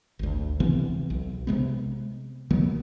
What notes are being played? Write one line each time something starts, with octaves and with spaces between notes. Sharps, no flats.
G#1 D2
C3 E3 B3 C4
B1
C3 G#3 B3
D#3 F#3 A#3 B3